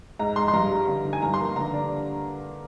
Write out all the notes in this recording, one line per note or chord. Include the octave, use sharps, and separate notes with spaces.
G#2 A#5
G#3 C6
C6
G2 A#5
G3
D3
D#4
G#5
G2 A#5
C6
A#3
A#5
D3 A#5
D4